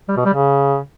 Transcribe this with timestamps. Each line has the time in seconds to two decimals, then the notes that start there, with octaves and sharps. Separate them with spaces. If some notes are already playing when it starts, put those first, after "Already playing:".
0.08 G3
0.17 B2
0.25 G3
0.34 C#3